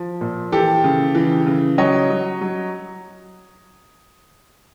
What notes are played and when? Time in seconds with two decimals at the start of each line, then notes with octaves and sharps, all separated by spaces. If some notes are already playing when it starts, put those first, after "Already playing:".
Already playing: F3
0.21 A#2
0.52 E3 G4 A4
0.84 C#3
1.15 E3
1.47 C#3
1.78 F#3 C#5 D#5
2.10 F#3
2.41 F#3